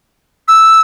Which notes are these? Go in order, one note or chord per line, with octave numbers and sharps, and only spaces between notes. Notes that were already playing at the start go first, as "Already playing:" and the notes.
E6